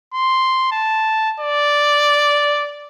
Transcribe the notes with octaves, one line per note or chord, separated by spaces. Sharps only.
C6
A5
D5